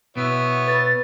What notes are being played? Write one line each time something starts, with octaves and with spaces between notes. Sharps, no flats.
B2 B3 E4 C#5
B4 A6